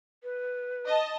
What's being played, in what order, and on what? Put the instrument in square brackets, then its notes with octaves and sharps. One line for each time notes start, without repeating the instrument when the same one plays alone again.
[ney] B4
[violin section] D#5 A5